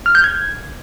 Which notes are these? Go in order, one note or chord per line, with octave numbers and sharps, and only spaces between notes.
F6
G6
G#6